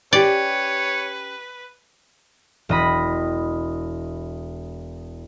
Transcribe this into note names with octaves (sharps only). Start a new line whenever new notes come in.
C#4 G4 B4 C#5 D5
E1 D#5 B5